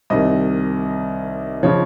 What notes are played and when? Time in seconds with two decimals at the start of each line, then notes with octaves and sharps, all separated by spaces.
0.10 C2 C3 D#3 D#5
1.63 C#3 F3 C#5